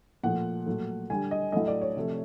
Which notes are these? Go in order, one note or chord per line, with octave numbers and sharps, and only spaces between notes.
A#2 F3 A3 F#5
A#2 F#3 A3
D3 G3 G#5
D#5
A2 F#3 A3 D#5
D5
C#5
C3 F3 A3